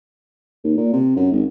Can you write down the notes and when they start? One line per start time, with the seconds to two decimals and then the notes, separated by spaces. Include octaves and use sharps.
0.64 D#2
0.77 A#2
0.93 C3
1.16 F#2
1.32 G#1